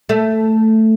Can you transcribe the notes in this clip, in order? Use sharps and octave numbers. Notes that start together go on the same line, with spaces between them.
A3